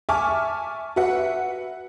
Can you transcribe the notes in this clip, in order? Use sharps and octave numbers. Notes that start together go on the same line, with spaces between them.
E5 G#5 A5 C#6 D6 F6
F#4 B4 E5 F#5